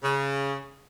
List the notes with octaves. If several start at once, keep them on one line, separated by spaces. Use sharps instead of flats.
C#3